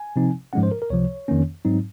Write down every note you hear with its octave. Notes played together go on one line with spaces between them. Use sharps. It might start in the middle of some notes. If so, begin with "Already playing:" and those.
Already playing: G#5
C3 F3 C4 D#4
G#2 F3 G#3 C#4 F#5
C5
A#4
A#4
C#2 C3 F3 C#5
F2 D#3 A#3 C#4
G#2 F#3 C4 D#4